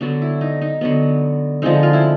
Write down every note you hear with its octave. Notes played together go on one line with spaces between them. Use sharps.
D3 F#3 B3 D4
E4
D#4
D#4
D3 F#3 B3
D3 F3 G#3 C4 D#4
F4
E4